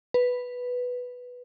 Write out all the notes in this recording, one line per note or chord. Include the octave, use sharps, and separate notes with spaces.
B4